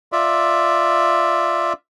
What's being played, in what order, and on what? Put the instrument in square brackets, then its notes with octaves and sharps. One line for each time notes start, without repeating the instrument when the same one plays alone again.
[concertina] F4 D5 E5